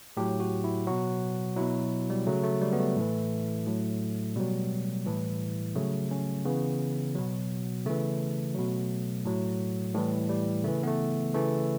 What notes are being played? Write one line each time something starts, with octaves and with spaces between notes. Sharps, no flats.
A2 F#3 G4
F#4
E4
B2 F#3 F#4
B2 F#3 E4
G3
C#3 F#3 A3
A3
G3
B3
A3
A2 E3
A2 F#3
B2 F#3 G3
A2 E3
C#3 F#3 A3
C#4
C#3 E3 B3
B2 F#3
C#3 E3 A3
B2 F#3
A2 F#3
A2 E3 G3
G3
C#3 E3 A3
B3
A3
C#3 E3 A3